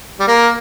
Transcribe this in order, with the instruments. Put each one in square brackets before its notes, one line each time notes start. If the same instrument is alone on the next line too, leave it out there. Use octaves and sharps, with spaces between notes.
[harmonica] G3
[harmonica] A#3 [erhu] A#4